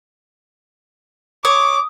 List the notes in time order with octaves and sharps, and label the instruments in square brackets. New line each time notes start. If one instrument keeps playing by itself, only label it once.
[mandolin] C#5 [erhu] D6 [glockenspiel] D#6